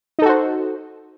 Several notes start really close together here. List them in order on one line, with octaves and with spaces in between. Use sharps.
D#4 A4 F#4 C5